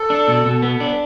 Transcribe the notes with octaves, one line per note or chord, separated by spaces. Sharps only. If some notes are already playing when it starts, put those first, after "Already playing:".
Already playing: A4
D4
B2
B2
B3
D4